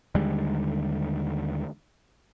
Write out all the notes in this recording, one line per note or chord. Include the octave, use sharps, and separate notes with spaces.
D#2 D3 G3 G#3